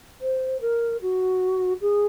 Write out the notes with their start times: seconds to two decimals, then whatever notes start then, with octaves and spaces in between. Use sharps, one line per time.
0.21 C5
0.60 A#4
1.01 F#4
1.81 G#4